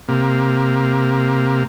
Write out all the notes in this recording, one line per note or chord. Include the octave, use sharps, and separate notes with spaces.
C3 A#3